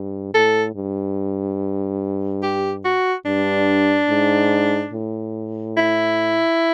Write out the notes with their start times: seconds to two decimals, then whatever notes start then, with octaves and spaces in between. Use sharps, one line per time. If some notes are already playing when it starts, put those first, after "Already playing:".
Already playing: G2
0.34 A2 A4
0.75 G2
2.43 G4
2.85 F#4
3.26 G2 D4
4.09 G#2
4.93 A2
5.77 E4